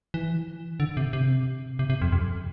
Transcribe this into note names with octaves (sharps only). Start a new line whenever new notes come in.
E3
D3
C3
C3
C3
C3
F2
F2